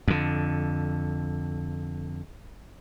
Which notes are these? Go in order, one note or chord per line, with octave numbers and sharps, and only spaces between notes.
F2 D3